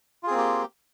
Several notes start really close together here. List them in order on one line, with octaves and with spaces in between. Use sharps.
F4 G#4 C4 A#3 G4